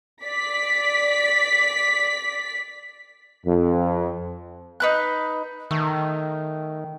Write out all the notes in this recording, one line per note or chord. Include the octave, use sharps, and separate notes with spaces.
D5 B6
F2
D#4 B4 F#6
D#3 A3